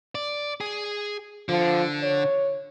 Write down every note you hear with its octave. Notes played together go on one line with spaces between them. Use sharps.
D5
G#4
D3 F3
C#5